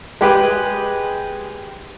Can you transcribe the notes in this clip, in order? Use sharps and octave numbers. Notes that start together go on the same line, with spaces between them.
G#3 G4 B4